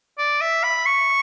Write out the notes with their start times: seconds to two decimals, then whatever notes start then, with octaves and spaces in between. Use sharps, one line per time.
0.18 D5
0.41 E5
0.63 B5
0.86 C#6